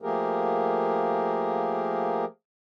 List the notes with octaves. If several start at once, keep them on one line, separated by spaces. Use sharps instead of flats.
F3 A3 A#3 G4 G#4 A#4